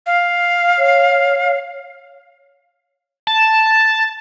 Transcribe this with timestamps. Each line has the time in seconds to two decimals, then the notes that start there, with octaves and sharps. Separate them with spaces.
0.06 F5
0.79 C#5
3.27 A5